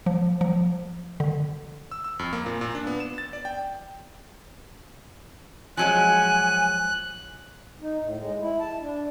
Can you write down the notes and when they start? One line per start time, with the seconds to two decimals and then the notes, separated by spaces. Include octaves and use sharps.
0.06 F3
0.41 F3
1.20 D3
1.91 E6
2.04 E6
2.19 F2
2.33 A#3
2.46 A#2
2.61 A#2
2.75 D4
2.87 B3
3.00 E7
3.18 A6
3.33 D5
3.45 G5
5.77 F3 F#3 G#3 G#5 F#6
7.81 D#4
8.02 A2
8.18 G#3
8.41 E4
8.60 A5
8.80 D4